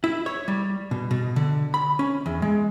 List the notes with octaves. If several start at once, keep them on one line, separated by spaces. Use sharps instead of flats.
E4
C#5
G3
B2
B2
D3
B5
C#4
E2
G#3